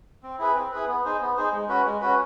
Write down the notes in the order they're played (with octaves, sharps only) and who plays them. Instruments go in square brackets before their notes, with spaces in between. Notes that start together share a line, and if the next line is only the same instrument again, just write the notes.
[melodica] C4
E4 G#4 B4
C4
E4 G#4 B4
B3
D#4 G#4 C5
B3
D#4 G#4 C5
G#3
C#4 F#4 B4
G#3
C#4 F#4 B4